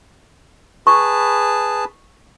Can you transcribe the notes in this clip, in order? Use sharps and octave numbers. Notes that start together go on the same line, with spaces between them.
G#4 B4 A5 C#6